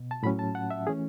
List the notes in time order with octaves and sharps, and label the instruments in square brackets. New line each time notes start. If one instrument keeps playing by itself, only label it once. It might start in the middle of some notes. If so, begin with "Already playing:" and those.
Already playing: [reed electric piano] B2
A5
A2 F#3 C#4 B5
A5
F#5
E5
E3 A3 C#4 G#4